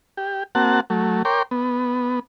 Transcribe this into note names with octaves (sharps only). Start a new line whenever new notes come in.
G4
A#3 C4 F#4 F#5 A5
F#3 A3
A#4 C#5 G5 C6 D6
B3